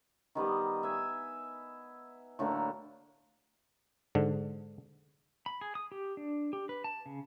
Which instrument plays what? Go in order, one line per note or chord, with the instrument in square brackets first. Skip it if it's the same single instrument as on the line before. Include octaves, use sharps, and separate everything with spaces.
[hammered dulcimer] D#3 G3 B3 D#5
E5 G#5
A2 D3 F#3 A#3
[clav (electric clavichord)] G#2 D3
[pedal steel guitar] B5
G#4
D#6
G4
D4
G4
B4
A5
C#3